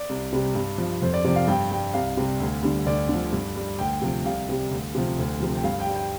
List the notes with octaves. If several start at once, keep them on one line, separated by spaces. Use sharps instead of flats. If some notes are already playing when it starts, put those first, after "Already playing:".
Already playing: D5
C2
C3 G3
G2
F3
F2 C5
D5
C3 F3 D5
F5
G2 G5
G3 G5
C2 F5
C3 G3
D2
D3 G3
D2 D5
D3 F3
G2
G3
D2 G5
C3 F3
C2 F5
C3 G3
D2
C3 F3
D2
C3 F3
G5
G2 F5
G5
G3
G5